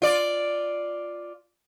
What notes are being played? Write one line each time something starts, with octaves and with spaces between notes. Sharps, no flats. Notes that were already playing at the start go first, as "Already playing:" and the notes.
F4 D5